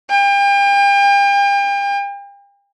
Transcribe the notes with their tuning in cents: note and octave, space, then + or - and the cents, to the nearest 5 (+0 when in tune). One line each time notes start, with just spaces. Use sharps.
G5 +40